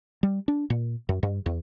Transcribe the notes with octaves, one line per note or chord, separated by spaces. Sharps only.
G3
D4
A#2
F#2
G2
E2